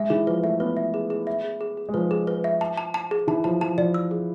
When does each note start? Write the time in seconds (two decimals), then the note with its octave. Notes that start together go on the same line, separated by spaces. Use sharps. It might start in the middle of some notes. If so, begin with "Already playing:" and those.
Already playing: G#3 E5
0.10 E3 G#4
0.27 F3 B4
0.43 A3 E5
0.60 B3 B4
0.77 E5
0.94 G#4
1.10 G#4
1.27 E5
1.44 G#4
1.61 G#4
1.77 G#4
1.89 G#3
1.94 F3 B4
2.11 G#4
2.27 B4
2.44 E5
2.61 A5
2.77 A5
2.94 A5
3.11 G#4
3.27 E3 A5
3.44 F3 A5
3.61 F3 A5
3.78 F3 D5
3.94 E6
4.11 G#4